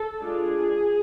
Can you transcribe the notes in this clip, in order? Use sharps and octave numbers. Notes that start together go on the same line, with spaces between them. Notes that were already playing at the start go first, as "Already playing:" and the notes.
Already playing: A4
G#3 D4 F4 G#4